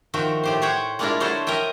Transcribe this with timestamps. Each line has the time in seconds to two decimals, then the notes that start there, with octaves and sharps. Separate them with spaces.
0.14 D#3 F3 F#4 E5 G5
0.43 A2 G4 C5
0.62 C5 C#5 F#5 G5
0.99 G#3 A#3 D4 E4 F4 A#4
1.20 D3 F#3 E4 A4 C5 C#5
1.47 A#4 D#5 E5 G5